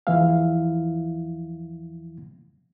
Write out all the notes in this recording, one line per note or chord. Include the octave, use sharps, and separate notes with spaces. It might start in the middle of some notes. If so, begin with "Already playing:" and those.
E2 E3 F3 E4 E5 F5